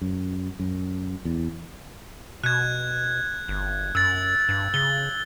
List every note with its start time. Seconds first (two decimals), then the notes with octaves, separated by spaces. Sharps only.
0.01 F#2
0.60 F#2
1.25 E2
2.44 B2 F#6 G#6
3.48 G1
3.95 F#2 E6 A6
4.49 G2
4.74 C#3 G7